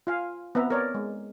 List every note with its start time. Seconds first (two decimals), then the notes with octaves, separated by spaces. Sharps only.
0.07 F4 F5 G#5
0.55 B3 C4 B4 E5 A#5
0.70 A#4 C#5 D5
0.94 G#3